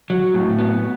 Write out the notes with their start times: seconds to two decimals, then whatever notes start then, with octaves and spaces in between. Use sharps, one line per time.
0.10 F#3
0.34 A2
0.59 B3